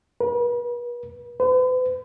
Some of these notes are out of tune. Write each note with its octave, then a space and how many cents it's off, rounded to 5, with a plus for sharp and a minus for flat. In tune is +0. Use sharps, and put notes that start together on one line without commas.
B4 -40
B4 +45